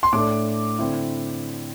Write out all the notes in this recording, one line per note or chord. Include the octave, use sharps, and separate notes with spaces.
C6
A2 A3 D4 D6
D3 C4 E4